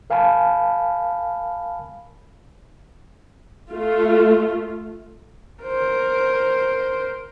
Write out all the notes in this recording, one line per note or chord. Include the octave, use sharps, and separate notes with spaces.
A#4 F5 G#5 A5 B5
A3 F4
A#4 C5